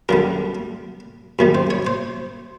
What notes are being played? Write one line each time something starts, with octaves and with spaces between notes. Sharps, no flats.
F#2 D3 G3 A#4
F#2 D#3 G3
C5
C#5
C5